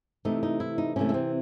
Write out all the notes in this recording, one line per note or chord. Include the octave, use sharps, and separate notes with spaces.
C3 E3 A3 D#4
D#4
E4
D#4
C3 E3 A3 C#4
A3
C4